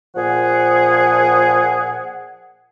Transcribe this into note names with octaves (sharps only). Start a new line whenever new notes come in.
A#2 F3 G#4 F#5